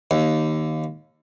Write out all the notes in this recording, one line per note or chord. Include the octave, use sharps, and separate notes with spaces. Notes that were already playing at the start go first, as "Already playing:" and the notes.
D#2